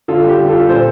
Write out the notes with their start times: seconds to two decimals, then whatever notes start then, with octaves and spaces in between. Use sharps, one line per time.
0.08 D3 F4 A4
0.24 G3
0.29 G4
0.39 D3
0.49 F4 A4
0.54 G3
0.69 A#2 A4 C5